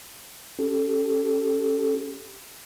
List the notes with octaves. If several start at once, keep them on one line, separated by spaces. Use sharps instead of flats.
C#4 G4 A4